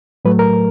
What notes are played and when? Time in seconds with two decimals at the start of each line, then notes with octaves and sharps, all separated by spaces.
0.25 A2 F#3 A3 B4
0.39 A#4